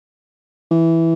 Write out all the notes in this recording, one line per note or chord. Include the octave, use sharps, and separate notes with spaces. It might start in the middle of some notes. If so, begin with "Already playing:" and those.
E3